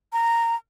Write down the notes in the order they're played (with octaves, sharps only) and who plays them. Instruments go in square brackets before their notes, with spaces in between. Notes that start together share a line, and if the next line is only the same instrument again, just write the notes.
[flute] A#5